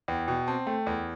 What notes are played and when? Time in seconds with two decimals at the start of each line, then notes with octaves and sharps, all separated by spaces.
0.08 E2 G5
0.28 B2 G5
0.47 C4 A5
0.67 A3 G5
0.86 E2